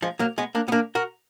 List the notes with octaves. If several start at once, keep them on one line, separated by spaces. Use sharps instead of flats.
F3 G#3
F#3 A#3
G#3 B3
A#3 D4
B3
A#3 D4
F#4 A#4